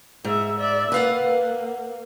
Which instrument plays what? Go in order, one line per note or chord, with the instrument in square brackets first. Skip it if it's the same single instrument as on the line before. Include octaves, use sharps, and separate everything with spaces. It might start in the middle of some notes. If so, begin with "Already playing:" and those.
[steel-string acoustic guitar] G#2 [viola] G#4 E5
[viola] D5 E5
[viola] A#3 [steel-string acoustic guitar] B4 F5 F#5